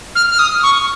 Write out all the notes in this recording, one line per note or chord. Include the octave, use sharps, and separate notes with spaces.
F6
F6
D#6
C#6